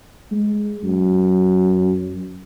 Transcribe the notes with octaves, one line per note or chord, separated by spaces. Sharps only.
G#3
F#2